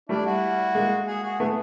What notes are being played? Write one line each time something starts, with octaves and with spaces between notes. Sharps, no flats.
G3 A3 D4 E4
E4 F#4
G#3 A#3
F#4 G#4
F#4 G#4
A3 B3 F#4 G#4